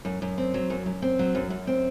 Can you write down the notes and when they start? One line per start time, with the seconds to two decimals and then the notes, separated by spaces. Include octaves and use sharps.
0.05 F#2
0.22 F#2
0.38 C4
0.54 F#3
0.70 F#2
0.86 F#2
1.02 C4
1.19 F#3
1.35 F#2
1.50 F#2
1.67 C4